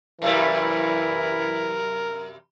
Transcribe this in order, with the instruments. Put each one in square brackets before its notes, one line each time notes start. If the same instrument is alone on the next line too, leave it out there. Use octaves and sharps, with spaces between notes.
[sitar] F#2 C3 G3 [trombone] E3 [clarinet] E4 [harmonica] A#4